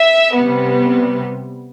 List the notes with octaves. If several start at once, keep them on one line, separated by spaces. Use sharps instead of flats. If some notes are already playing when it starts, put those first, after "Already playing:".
Already playing: E5
C3 G3 B3